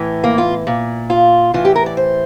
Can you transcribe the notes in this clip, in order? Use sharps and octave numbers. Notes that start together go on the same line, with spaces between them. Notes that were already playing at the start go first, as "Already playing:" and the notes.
Already playing: A2 E3
A#3
F4
A#2
F4
A2 E3 F4
G4
A#4
D5
C5